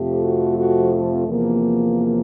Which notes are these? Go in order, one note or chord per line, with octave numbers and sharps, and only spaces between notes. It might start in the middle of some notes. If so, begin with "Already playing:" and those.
Already playing: F2 C3 F3 A3 G4
F#4
F#4
E2 C3 F3 A#3